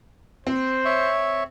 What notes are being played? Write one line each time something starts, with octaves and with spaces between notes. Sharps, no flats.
C4 C5
C#5 E5 C#6